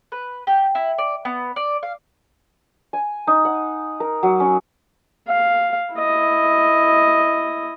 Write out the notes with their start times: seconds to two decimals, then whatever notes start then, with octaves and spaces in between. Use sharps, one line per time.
0.12 B4
0.47 G4
0.75 E4
0.98 D5
1.25 B3
1.56 D5
1.83 F5
2.93 G#5
3.27 D#4
3.45 F#5
4.00 A#4
4.23 F#3
4.40 C#4
5.28 F5
5.95 E4 D#5